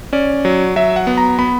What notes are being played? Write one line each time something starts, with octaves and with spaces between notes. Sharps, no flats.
C#4 D5
F#3
F#3 E5
F#5
B3
A#5
B3 B5